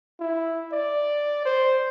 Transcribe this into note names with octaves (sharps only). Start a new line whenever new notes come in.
E4
D5
C5